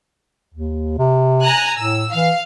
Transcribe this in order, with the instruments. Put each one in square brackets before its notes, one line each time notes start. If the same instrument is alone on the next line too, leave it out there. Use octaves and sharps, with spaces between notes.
[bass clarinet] D#2
C3
[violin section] G#5 A#5 F#6
[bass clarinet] A2 [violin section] E6
[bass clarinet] E3 [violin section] F5